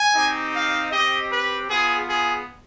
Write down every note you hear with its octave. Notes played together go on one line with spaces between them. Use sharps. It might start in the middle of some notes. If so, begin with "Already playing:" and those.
Already playing: G#5
C4 D#4 G4
F5
C4 G4 D#5
B4
B3 F4 G#4
G#4